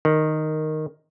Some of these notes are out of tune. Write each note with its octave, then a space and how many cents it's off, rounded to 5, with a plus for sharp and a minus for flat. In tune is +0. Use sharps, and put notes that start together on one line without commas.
D#3 -5